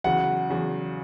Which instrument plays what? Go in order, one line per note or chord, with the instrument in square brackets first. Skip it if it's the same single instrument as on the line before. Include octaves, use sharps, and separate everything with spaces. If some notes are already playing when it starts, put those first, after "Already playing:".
[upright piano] E2 C#3 F#3 [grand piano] F#5
[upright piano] E2 C#3 F#3